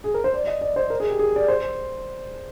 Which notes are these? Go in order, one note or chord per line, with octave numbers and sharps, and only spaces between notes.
G#4
A#4
C5
D5
D#5
D5
C5
A#4
G#4
G4
G#4
D5
C5